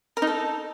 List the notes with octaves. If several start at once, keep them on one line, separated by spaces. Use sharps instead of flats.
A#4
D#4
A4